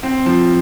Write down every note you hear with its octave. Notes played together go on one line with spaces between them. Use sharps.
C4
F3